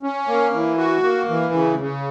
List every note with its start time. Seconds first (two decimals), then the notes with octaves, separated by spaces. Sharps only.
0.03 C#4
0.28 A#3
0.53 E3
0.78 F#4
1.03 A#3
1.29 E3
1.53 C#3
1.78 C#3